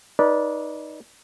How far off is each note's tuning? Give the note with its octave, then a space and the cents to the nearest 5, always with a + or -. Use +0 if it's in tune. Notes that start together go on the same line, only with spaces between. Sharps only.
D#4 +0 B4 -30 D5 -10